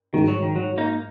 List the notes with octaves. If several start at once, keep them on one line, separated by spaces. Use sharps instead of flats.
G#2 D#3 G#3 F#4
F#3
D#3
F#3
A#3 D#4